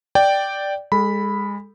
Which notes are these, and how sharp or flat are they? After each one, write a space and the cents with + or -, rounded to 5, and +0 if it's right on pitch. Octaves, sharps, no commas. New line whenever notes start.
D5 +0 G5 -5
G#3 -30 A4 +0 B5 +0